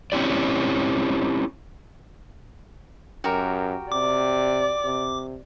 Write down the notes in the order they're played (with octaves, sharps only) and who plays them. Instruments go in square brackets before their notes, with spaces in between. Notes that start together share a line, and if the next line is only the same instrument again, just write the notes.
[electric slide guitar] C4 C#4 E4 G4 D5
[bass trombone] F#2 [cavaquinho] F#4 G4 A#4
[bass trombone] C3 [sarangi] D5 [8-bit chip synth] D6
[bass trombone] C3